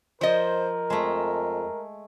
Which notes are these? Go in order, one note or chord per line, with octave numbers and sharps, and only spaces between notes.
F3 A#4 C5 D#5
F2 G#3 A3